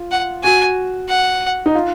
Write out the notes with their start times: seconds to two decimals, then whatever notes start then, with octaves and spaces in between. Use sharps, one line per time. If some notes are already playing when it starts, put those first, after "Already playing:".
Already playing: F4
0.11 F#5
0.43 F#4 G#5
1.08 F#5
1.66 D#4
1.75 F4